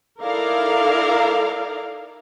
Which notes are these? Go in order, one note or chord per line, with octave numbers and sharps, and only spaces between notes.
D#4 E4 A4 A#4 D5 F5